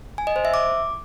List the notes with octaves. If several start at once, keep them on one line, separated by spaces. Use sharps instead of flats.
G#5
D#5
C5
E5
D6